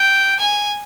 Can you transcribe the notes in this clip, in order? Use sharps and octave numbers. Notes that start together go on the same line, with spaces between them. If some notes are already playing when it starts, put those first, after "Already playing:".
Already playing: G5
G#5